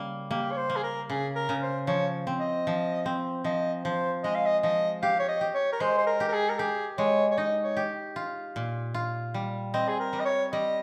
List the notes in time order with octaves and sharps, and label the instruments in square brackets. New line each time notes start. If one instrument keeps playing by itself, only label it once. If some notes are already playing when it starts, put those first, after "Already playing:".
Already playing: [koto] C#3 G3 A#3
[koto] A#3 [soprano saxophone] G4
[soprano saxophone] C#5
C5
[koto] A#3
[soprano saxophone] G#4
A#4
[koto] C#3 [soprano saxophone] G#4
[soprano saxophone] A#4
[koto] C#3
[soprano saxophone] C5
[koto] F3 [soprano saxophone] C#5
[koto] C4
[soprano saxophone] D#5
[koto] F3
C4
[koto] F3 [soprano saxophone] D#5
[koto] F3 [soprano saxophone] C5
[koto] G#3 [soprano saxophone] D#5
[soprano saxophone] F5
D#5
[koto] F3 [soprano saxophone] D#5
[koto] G4 [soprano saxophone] F5
[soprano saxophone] C#5
D#5
[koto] G4
[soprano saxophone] C#5
A#4
[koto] G#3 [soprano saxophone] C5
[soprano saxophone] C5
A#4
[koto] G4
[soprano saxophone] A#4
G#4
A#4
[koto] G4 [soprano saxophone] G#4
[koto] G#3 [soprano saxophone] C#5
[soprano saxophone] C#5
[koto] D#4 [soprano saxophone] D#5
[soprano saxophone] C#5
[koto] G4
F4
A#2
F4
G3
[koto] C4 [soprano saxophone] D#5
[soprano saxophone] G#4
A#4
[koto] G3
[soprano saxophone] D#5
C#5
[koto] G3 [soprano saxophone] D#5